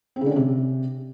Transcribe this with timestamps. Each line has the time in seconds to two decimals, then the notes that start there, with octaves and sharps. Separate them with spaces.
0.16 C4
0.21 C#3
0.26 D3
0.31 C#4
0.36 C3